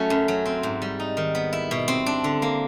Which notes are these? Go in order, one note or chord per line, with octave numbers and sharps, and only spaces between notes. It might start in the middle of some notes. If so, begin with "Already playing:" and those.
Already playing: F#3 A3 C#4 E4
F#2
F#3
C4
G#2
G3
D#4
D#3
B3
E4
B2
C4
D4
D3
A#3